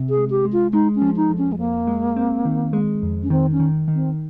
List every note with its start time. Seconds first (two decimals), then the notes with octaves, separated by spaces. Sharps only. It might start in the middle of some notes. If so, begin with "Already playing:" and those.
Already playing: C3
0.10 G#4
0.17 G#3
0.30 G4
0.45 G#3
0.52 F4
0.73 G#3 D#4
0.95 C#4
1.02 F3
1.17 D#4
1.30 F2
1.38 C#4
1.52 G#3
1.59 F2 A#3
1.87 G#3
2.16 C4
2.45 D#3
2.73 G#3
3.03 F2
3.23 C#4
3.30 D#3 C4
3.52 C#4
3.60 D#3
3.88 D#3
3.95 C4